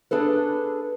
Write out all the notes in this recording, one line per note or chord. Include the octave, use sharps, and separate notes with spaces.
D4 G#4 A4 B4